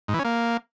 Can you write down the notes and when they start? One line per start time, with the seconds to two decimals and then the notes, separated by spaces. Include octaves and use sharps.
0.08 G#2
0.14 E3
0.19 C#4
0.25 A#3